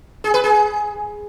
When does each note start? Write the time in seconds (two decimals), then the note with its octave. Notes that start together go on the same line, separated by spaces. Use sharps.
0.24 G#4
0.34 B4
0.44 G#4